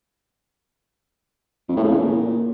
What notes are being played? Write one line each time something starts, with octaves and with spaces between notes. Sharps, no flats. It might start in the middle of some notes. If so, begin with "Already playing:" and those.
F2
A2
C#3
E2
A#2